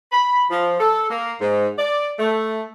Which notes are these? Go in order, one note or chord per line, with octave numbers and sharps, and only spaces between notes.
B5
F3
A4
A#3
G#2
D5
A3